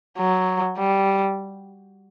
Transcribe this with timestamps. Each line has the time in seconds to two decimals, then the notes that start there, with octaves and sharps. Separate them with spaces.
0.18 F#3
0.78 G3